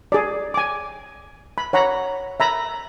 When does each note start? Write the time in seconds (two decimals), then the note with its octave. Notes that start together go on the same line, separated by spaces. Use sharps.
0.12 G#4 D5
0.54 G#5 D6
1.58 B5
1.73 C#5 F#5 A#5 B5
2.40 E5 A#5 B5